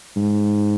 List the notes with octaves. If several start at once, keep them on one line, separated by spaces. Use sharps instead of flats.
G#2